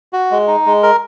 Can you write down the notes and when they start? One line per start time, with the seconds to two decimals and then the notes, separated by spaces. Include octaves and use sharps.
0.13 F#4
0.31 G#3
0.48 D#4
0.66 G#3
0.83 A#4